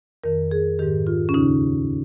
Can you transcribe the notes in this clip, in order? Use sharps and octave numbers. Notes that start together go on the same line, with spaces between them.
F2 D#3 A#4
G#4
G#2 D#3 G4
F4
C#4
D#2 C#3 D#4